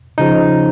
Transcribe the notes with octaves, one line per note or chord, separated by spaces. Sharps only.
C#3 F3 D#4